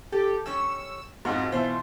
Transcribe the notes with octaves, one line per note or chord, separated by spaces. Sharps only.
G4 A4
G3 C#4 C#5 E6
F2 G#2 F4 F#4
B2 E3 F4 C5 E5